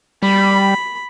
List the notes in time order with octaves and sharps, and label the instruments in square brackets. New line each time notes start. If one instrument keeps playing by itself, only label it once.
[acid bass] G3 [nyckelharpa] B5